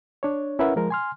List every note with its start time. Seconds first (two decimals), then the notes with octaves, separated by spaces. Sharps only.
0.23 D4 C#5
0.59 C#4 E4 A#4 B4 E5 F#5
0.76 F3 G#3 A#4
0.90 G#5 C6 F6